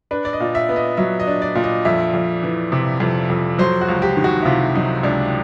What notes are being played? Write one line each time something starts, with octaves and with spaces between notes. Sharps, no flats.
D4 B4
D5
D#5
A#2
E5
B3
D#5
F#3 E5
D#5
D4
D5
A#2
D#5
F2 E5
F2
E3
C3
F2
F2
F#3 C5
F#4
C#2
G4
D#3
F#4
E4
C3 F4
F#3 D#4
C#2 D4